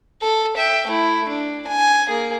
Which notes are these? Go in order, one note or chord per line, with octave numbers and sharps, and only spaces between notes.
A4
E5 G5
A3 E4
D4
G#5
A#3 G#4